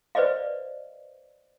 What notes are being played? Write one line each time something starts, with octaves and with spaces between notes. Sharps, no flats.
B4 C5 D5 D#5 F5